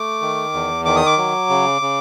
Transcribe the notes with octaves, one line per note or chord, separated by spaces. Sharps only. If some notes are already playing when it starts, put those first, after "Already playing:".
Already playing: A3 D6
D#3
E2
D#3 D6
D#6
D6
F#3
C#3
C#3